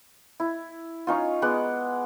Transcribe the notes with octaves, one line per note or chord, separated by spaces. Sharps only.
E4
C#4 D#4 F4
G#3 B3 D5 F#5